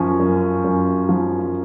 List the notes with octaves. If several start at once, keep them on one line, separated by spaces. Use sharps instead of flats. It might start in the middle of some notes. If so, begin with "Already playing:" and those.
Already playing: F#2 F3 C#4
F#2
F#2
F3